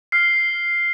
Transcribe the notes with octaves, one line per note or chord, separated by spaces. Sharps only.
F6 C7